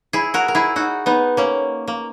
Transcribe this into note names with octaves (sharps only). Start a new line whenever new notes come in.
E4 G#4
F#4 A#4
A#4
E4 G#4
D#4 F#4
B3 D#4
A#3 C#4
A#3